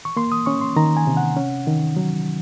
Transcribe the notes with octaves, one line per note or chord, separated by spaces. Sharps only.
C#6
A#3 C6
D#6
C#4 C#6
C6
D#3 A#5
G#5
C3
F#5
C#4
D#3
F#3